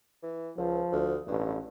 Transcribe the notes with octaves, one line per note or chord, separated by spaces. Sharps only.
E3
C#2 F3
D2
A1 G2